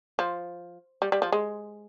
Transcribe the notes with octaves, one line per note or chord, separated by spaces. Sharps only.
F3
G3
G3
F3
G#3